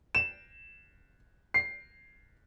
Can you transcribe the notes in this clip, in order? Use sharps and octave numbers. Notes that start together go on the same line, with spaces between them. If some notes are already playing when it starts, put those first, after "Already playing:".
E7
C7